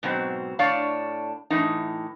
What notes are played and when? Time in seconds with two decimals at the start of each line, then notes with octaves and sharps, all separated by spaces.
0.03 G#2 B2 F#3 C4
0.59 A2 D4 C#5 D5 F5
1.50 A2 E3 D#4